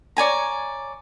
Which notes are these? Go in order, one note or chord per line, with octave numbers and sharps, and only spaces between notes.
C#5 D5 G#5 A#5